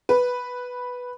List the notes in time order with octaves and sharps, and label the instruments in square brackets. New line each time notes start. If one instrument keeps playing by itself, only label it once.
[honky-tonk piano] B4